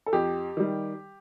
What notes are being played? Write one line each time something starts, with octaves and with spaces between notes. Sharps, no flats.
A4
F2 G4
D#3 G3